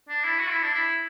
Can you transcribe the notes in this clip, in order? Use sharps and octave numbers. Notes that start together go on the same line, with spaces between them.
D4
E4
F#4
E4
D4
E4